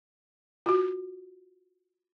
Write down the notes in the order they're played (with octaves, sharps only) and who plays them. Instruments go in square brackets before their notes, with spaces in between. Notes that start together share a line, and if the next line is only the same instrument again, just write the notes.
[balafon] F4 F#4